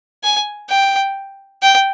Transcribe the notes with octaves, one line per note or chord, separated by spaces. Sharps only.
G#5
G5
G5